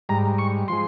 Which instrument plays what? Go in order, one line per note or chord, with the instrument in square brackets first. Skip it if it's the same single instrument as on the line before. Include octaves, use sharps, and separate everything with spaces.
[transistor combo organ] G#2 G3 A#5
C#6
F3 G#3 C6